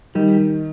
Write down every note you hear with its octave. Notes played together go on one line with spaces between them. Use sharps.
D#3 G3